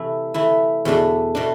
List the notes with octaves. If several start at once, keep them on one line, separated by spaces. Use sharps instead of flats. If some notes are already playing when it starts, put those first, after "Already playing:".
Already playing: C3 E3 A3 E4
E3 A3 E4
E2 B2 A3 D4
B2 A3 D4